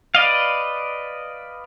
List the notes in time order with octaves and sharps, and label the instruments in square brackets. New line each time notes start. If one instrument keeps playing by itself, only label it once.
[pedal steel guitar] B4 D5 D#5 F5